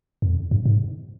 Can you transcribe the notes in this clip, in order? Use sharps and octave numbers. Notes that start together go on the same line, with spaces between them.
F2
G2
G#2